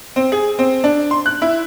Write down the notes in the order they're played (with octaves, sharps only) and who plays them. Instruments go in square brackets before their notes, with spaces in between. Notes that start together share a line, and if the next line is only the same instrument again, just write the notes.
[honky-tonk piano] C4
G#4
C4
D4
C6
F#6
E4